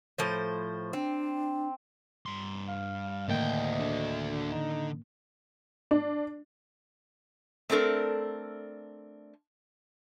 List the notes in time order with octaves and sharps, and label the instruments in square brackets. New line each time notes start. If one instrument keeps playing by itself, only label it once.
[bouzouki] A2 F3 C5
[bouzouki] C4 [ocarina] D4
[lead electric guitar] G2 C6
[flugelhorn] F5
[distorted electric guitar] D2 G5 [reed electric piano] A2 D#3 A#3 [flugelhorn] D#5
[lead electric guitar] D3 A4
[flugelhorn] D#4
[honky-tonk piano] D4
[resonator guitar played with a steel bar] A3 C4 D4 A4 A#4